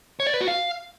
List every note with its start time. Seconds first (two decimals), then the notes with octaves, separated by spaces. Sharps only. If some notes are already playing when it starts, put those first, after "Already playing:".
0.20 C#5
0.27 D5
0.34 B4
0.41 F#4
0.48 F5